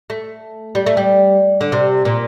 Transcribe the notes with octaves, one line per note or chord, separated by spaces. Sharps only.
A3
G3
A3
G3
D3
C3
A#2